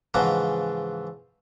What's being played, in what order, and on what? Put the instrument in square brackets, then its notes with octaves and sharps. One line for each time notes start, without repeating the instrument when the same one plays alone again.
[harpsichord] G#2 C#3 E3 F3 F#5 A#5